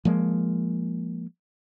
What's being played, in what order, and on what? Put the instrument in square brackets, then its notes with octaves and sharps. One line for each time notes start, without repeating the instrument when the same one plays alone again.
[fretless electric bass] F3 G#3 A#3